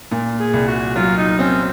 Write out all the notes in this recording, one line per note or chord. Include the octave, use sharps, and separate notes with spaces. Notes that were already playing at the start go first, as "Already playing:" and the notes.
A#2
G#4
C2
F#4
F#3 F4
D#4
C4 C#4